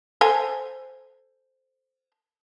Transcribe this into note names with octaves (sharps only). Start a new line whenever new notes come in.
A4 C5 G#5